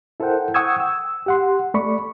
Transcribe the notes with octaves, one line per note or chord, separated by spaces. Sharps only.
E4 A4 A#4 C5 F#5 G5
F#5 G5 C#6 D#6 E6 G#6
E6
G4 F#5 C6
A3 D5 B5 C#6